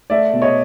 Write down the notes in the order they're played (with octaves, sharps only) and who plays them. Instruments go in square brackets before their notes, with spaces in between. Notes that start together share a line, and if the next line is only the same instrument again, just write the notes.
[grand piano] A3 D5 E5
B2
C#5 D#5